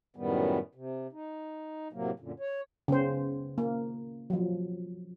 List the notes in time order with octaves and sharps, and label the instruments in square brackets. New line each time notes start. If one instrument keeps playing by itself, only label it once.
[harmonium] F#2 A2 D#3 G3 B3
C3
D#4
A2 C3 F#3 A#3
F#2 A#2 D3
C#5
[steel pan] C#3 B3 C5
A#3
F3 F#3